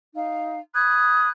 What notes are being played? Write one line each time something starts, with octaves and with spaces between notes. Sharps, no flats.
D#4 F5
B5 D#6 F#6 G#6